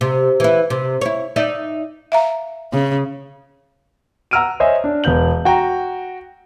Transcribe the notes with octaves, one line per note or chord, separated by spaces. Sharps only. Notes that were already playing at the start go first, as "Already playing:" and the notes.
C3
E3 E4
C3
E4 C#5
D#4 D5 E5
E5 F5 A#5
C#3
F#5 A#5 E6 F6 D7 D#7
C5 C#5 D#5 E5 G#5
D4
E1 B3 G6 F#7
F#4 G5 A#5